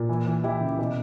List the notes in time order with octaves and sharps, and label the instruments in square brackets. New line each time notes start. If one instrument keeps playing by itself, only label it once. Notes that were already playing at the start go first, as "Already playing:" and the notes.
Already playing: [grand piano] A#2
E3
E3
E3 E4 G4
C#3
B2